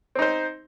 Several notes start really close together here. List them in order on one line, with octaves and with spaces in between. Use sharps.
C4 D#4 C5